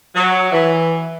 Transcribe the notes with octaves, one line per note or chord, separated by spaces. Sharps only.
F#3
E3